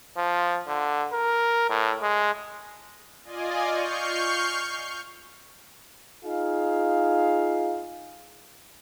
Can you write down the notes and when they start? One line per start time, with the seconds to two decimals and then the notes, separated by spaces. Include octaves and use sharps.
0.17 F3
0.67 D3
1.13 A#4
1.70 A2
2.02 G#3
3.25 F4 D5 D#5 G#5
3.68 C#6 F6 G6 C7
6.25 D#4 F4 G#4 F5